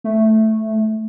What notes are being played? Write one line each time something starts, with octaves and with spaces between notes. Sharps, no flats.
A3